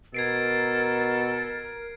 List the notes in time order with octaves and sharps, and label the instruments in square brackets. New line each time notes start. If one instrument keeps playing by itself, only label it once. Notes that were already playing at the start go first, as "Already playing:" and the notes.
[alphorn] B2 [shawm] A4 [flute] A#4 [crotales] G#6 C7 D7